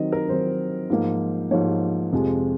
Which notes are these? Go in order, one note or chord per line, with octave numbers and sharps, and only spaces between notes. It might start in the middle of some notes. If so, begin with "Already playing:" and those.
Already playing: D#3 F#3 C4 D#5
A#4
D#3 F#3 C4 C5
G#2 F3 A#3
G#2 F3 A#3 C#5
F2 C3 F3 G#3